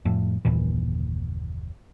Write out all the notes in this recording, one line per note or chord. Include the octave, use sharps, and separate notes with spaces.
F2 A2
F#1 D#2 A#2 E3